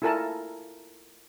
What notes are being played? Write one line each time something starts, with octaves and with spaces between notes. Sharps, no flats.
E4 F4 A4 A#4 G#5 A5